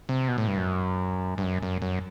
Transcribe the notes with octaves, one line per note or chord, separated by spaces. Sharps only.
C3
B2
A2
G2
F#2
G2
F#2
F#2
F#2